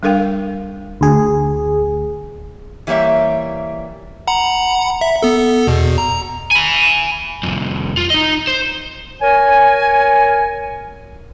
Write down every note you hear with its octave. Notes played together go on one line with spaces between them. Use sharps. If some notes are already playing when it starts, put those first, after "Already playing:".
G3 D4 A4 A#4 F5 G5
D2 G#4
E3 G3 A#3 C#5 E5
F#5 A#5 B5
E5
B3 A4
E2 B2
A#5
G#5 B5
C2 F2
F4
D#4 D#5
C5
A#4 C#5 G#5